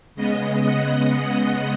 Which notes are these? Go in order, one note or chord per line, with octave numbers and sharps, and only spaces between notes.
C#3 G#3 B3 D#5
F#5